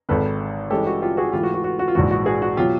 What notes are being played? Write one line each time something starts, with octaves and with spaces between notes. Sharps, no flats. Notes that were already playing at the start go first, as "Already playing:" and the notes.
G#1 G#2 D#3 A4 B4
G2 E3 G#3 C#4 G4 A4
F#4
F4 G4
F#4 G#4
G#2 E3 A3 F4 G4
F#4
F#4
F#4
F#4
F4
A#1 G#2 E3 F#4
F#4
F#4 G#4
F#4
B2 F#3 F4 G4